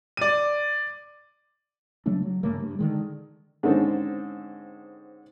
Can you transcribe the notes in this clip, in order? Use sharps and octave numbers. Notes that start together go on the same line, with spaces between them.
D5 D#7
C#3 F#3 A3 D4
F#3
G2 C#3 A3 A#3
G2
D3 D#3 G#3
G#2 D3 D#3 C4 C#4 A4